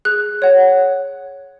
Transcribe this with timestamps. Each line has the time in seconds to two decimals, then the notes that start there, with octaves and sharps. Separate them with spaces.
0.05 G#4 F#6
0.42 C#5 F#5